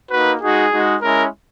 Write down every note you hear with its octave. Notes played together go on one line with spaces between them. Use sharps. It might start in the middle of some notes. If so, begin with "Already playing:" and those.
A#3 D#4 F#4 B4
G#3 D#4 F#4 G#4
G#3 D#4 F#4
G#3 C#4 E4 A#4